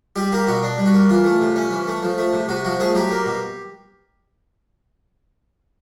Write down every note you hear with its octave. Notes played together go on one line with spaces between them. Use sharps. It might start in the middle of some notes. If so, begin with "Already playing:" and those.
G3 G4
A#3 G4
B2 F#4
D4
G3
F#4
A#3
E3 F4
A3
C3
C#4
E3
A3
F3
A3
C3
C3 F#4
F3 F#4
A3 G#4
F#3 G4
A#3
B2